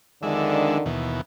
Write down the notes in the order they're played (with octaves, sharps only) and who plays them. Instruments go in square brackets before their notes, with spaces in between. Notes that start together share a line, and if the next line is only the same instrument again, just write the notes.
[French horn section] F2 D3 D#3 [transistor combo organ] G#3 D4 E5
[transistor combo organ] D#2 B2 E3